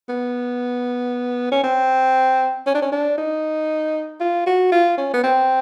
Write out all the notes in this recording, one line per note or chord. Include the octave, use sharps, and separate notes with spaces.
B3
C#4
C4
C#4
D4
C#4
D4
D#4
F4
F#4
F4
C#4
B3
C4